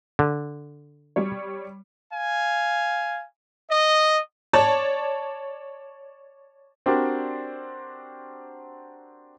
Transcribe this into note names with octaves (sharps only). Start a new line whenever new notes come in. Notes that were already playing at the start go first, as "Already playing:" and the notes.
D3
G3 C#5
F5 G#5
D#5
C#5 D5 A5
C4 D4 F#4 G4 A#4 D5